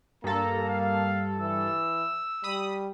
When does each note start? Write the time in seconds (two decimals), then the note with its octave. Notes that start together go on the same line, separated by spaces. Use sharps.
0.24 G2 A#3 A4 A#5
0.69 F5
1.39 E3 E6
2.44 G3 B5 D#6